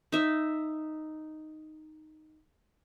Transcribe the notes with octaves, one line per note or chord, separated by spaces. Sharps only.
D#4 E5